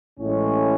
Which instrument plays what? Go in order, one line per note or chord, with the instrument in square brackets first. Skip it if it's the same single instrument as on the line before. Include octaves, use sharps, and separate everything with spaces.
[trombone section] A1 A2 G#3 C#4